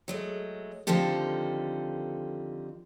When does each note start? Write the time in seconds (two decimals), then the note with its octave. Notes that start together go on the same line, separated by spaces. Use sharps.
0.08 F#3 G#3 A3
0.87 D3 D#3 F3 C4 G4 A4